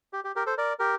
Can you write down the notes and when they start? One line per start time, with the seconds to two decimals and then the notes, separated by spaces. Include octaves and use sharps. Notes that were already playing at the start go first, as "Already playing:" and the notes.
0.13 G4
0.24 G4
0.36 G4 A#4
0.46 A4 C5
0.57 A#4 D5
0.79 G4 A#4